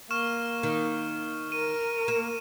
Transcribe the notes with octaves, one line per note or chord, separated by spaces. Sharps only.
A#3 C#6 F6 E7
D#3
A#4 D#7
A#3 E7